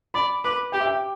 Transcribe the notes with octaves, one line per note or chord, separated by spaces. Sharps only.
D5 B5
B4 D6
G4 G5
E5
G5